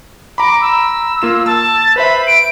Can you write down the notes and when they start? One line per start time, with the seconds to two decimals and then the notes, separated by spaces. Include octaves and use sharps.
0.38 A#5 B5 D6
0.62 E6
1.22 A#3 F4 E7
1.46 A5 E6
1.96 B4 C5 E5 B5
2.27 D7